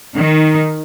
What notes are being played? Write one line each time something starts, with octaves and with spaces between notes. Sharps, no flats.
D#3